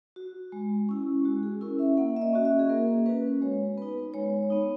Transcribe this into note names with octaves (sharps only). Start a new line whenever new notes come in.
F#4
G#3
C#4 E4
G#3 F#4
G#4
C#4 E4 A#4
E5
A#3 F#5
E5
D#5
C#4 F#4
E5
G#4
A#3 A#4
C#4 F#4 B4
G#3 C#5
B3 D#4 B4
G#3 C#5
B3 D#4